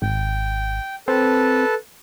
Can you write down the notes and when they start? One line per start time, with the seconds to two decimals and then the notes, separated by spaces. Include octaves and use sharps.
0.02 G#1 G5
1.08 C4 A4 B4 A5